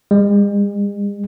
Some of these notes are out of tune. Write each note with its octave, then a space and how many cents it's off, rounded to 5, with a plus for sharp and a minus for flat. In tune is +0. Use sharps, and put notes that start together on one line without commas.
G#3 -40